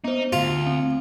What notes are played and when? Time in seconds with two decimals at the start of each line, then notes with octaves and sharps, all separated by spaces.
0.04 B3 D#4 C5
0.33 D2 G#2 F4 G7
0.67 C4